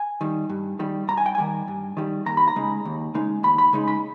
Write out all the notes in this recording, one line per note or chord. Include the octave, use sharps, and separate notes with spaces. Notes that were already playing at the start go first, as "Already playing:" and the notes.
Already playing: G#5
D#3 G3
G2
D#3 G3
G2 A#5
G#5
G5
D#3 G3 G#5
G2
D#3 G3
D#2 A#5
B5
A#5
C#3 G#3 D#4
D#2
C#3 G#3 D#4
D#2 B5
B5
C#3 G#3 D#4
B5